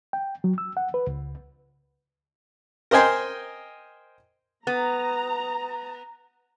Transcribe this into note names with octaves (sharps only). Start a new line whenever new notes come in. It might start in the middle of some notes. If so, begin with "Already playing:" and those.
G5
F#3
E6
F#5
B4
C#2
A#4 C5 D#5 G5 G#5 C6
B3 A#5